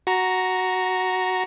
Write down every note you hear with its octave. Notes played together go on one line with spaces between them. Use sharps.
F#4 A#5